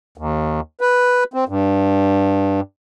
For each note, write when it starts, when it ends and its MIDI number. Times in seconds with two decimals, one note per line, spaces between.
0.18 0.60 39
0.81 1.24 71
1.34 1.44 60
1.48 2.61 43